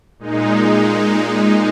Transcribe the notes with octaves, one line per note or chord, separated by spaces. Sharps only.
A#2 G#3 D#4